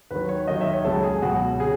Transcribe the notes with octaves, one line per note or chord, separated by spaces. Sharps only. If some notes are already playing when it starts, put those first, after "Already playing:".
D#2 D#3 F#3 B4
C#5
D#2 D#3 F#3 D#5
E5
C#5
C#2 C#3 F#3 A4
G#4
C#2 B2 F#3 F#4
C#3 G#4